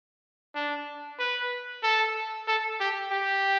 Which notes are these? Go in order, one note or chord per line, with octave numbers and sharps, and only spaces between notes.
D4
B4
A4
A4
G4
G4